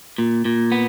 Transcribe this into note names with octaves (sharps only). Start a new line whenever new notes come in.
A#2
A#2
B3